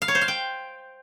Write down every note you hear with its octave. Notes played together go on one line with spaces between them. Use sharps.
F5
C#5
C5
F5
G5